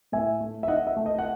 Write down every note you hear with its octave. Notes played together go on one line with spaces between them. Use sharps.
A2 E5 G#5
A3
E5
D#4 D#5 F#5
E5
A3
D#5
F#5